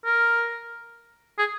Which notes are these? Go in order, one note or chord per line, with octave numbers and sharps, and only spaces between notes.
A#4
G#4